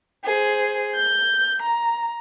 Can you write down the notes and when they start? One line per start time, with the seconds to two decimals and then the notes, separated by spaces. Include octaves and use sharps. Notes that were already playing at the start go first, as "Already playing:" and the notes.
0.25 G#4 C5
0.95 G6
1.62 A#5